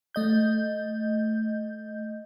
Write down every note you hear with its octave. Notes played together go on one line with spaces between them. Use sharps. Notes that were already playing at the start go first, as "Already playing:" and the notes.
A3 D#5 G6